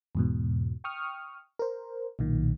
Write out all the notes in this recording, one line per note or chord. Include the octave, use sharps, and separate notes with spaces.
E2 G#2 B2
G5 C#6 D#6 F6
A#4 C5
B1 A#2 D#3